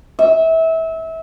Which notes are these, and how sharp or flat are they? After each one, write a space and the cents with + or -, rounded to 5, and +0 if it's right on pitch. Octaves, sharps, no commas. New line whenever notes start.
E5 -25